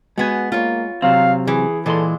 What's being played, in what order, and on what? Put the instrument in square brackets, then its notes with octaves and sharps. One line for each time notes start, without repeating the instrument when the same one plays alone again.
[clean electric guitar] G#3 G#5 [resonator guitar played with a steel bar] B3 F#4
[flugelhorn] A#3 [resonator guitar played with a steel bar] F4 C#5
[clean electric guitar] C3 F#3 C4 [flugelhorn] F5
[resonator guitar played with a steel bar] E3 [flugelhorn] G#4
[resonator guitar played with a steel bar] A#2 G#3 [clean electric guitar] E3 C6 [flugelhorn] A4